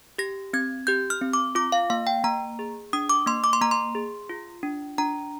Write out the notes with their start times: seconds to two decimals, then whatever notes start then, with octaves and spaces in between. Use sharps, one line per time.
0.18 G4 A#6
0.53 C4 G#6
0.87 G4 G6
1.10 F6
1.22 C4
1.33 D6
1.55 F4 D6
1.72 F5
1.90 A#3 F5
2.07 G5
2.24 A#3 A#5
2.59 G#4
2.93 D4 D#6
3.09 D6
3.26 A#3 C6
3.44 D6
3.53 C6
3.61 A#3 A#5
3.71 C6
3.95 G#4
4.29 F4
4.63 D4
4.98 D4 A#5